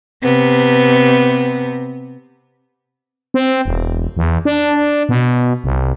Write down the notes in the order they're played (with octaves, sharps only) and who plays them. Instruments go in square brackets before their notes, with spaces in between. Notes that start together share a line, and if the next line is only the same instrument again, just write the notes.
[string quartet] C3 B3
[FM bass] C4
E1
E2
D4
B2
C2